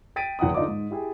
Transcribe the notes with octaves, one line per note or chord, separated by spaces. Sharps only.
G5 A6 B6 D7 D#7
F#1 E2 F#5 G5 D#6
D3 D#4 F4 D5 D6
G#2
E4 G4 G#4